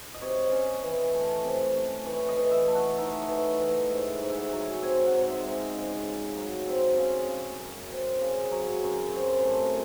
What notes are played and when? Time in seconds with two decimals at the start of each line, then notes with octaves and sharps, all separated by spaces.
0.14 D#5
0.21 C3 C#5
0.51 C#4
0.83 E3
1.14 A3
1.44 C3
1.75 C#4
2.06 E3 C#5
2.29 D#5
2.37 E3
2.51 E5
2.67 A3
2.75 F#5
2.98 D#4 E5
3.21 C#5
3.28 E3
3.59 E3
3.68 D#5
3.90 G#2 E5
4.13 F#5
4.21 G#2
4.30 E5
4.37 F#5
4.53 F#3
4.60 G#5
4.82 C4 G#5
5.06 F#5
5.14 G#2
5.28 E5
5.45 G#2
5.52 D#5
5.75 C#3 C#5
6.06 C#3
6.36 F#3
6.67 C4
6.98 C#3
7.29 C#3
7.59 F#2
7.90 C4
8.21 C#3
8.52 F#3
8.83 F#2
9.14 C4
9.39 C5
9.44 A2 A4